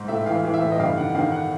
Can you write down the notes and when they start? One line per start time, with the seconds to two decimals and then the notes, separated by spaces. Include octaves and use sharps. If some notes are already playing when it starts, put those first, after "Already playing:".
Already playing: G#2
0.08 A2 E5
0.26 E3 F5
0.44 E3 F5
0.54 E5
0.61 A2
0.71 D#5
0.79 G2 F5
0.97 D#3 F#5
1.15 D#3 F5
1.32 F#5